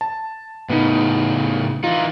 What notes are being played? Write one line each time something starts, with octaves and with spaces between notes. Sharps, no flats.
A5
A2 C#3 B3 D#4
E3 D#4 F4